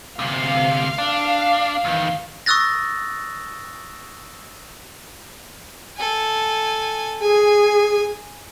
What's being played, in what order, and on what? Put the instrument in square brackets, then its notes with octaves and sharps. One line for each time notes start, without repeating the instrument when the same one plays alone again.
[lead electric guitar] D2 C3 [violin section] F5
[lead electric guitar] D4
E2 D#3
[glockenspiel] C#6 D#6 E6 F#6 A6 A#6
[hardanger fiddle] A4 G#5
[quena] G#4 [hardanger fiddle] G#5